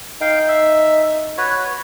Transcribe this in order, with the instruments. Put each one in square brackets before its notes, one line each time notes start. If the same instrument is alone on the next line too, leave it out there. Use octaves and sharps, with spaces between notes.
[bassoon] D#4 [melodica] F5 G5
[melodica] E5
F#4 B4 C#5